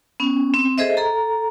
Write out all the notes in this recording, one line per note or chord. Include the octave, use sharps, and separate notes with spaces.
B3 C#4
C4
G#4 A4 C5 D#5 E5
A4 A#5